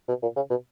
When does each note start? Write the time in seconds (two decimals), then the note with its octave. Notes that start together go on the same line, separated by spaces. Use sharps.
0.08 B2
0.22 A#2
0.36 C#3
0.50 B2